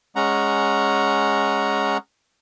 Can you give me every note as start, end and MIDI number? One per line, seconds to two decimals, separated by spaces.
0.16 1.98 56
0.16 1.98 61
0.16 1.98 78
0.16 1.98 82